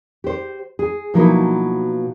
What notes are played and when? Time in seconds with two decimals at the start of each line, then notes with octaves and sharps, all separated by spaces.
0.24 G4 C5
0.79 G#4
1.14 B2 F3 F#3 A#3 D#4 E4